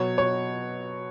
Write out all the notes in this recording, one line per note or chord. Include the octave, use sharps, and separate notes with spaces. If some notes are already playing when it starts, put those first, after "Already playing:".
Already playing: B2 F#3 C#5
C#5